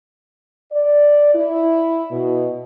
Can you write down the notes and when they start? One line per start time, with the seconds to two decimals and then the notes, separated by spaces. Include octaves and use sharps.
0.72 D5
1.34 E4
2.11 B2